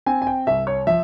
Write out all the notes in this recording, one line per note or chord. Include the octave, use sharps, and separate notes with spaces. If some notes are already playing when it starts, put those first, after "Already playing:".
C4 G#5
G#5
G5
C2 E5
C#5
F3 E5